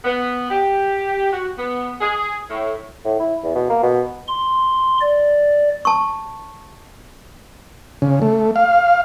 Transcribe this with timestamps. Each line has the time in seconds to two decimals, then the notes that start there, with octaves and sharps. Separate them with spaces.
0.05 B3
0.50 G4
1.33 F#4
1.58 B3
2.01 G#4
2.50 A2
3.05 A2
3.20 E4
3.44 E2
3.55 B2
3.70 A#3
3.83 B2
4.28 C6
5.01 D5
5.85 A5 C#6
8.02 C#3
8.22 A3
8.56 F5